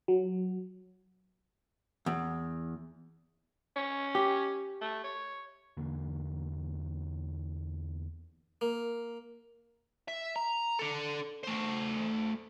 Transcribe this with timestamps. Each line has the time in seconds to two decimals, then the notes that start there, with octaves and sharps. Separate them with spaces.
0.08 F#3
2.06 E2
3.76 C#4
4.15 G4
4.81 A3
5.04 C#5
5.77 E2 D3 A#3
8.61 A#3
10.08 E5
10.36 A#5
10.79 D4 A4
11.43 A3 C5